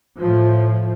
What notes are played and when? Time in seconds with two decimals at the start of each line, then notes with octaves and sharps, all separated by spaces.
0.19 A2 F3